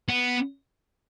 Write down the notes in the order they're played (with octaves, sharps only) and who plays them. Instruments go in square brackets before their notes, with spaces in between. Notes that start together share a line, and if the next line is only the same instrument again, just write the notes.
[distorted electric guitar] B3